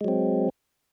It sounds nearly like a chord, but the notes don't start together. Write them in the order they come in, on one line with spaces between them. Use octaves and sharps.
G#3 F#3 C4